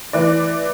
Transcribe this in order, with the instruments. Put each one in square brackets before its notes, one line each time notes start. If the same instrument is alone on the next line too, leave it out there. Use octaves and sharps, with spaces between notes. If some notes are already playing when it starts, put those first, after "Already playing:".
[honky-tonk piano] E3 D5